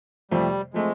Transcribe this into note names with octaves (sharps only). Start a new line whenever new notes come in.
F2 C3 F3 G3 A3
F3 G#3 A3 C4